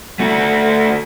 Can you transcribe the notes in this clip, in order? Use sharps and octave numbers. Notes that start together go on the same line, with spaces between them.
A3 F#4